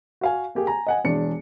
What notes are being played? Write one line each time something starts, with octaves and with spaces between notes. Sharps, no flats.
F#4 F5 G#5
A#3 G4 G#4
G#5 A#5
D#5 F#5 G#5
E1 E2 D4 C#7